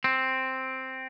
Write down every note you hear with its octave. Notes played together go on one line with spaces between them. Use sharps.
C4